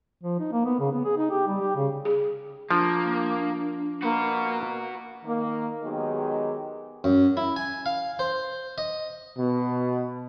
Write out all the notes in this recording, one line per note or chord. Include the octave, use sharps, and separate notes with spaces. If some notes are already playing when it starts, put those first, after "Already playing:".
F3
D#4
A#3
B3
C#3
B3
G#4
D#4
G4
G3
G4
C#3
G#4
F3 A#3 D4
A#3 F#4 B4
D#3 A#3
D#3 F#3 G#3 B3 G4 G#4
F#2
E4
G#5
F5
C5
D#5
B2